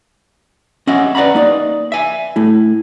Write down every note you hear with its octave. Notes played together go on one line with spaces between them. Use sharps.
C#4 D#5 E5 F#5
B4 D5 F#5 A#5 B5
A#3 D#4 D5
E5 G#5
A3 E4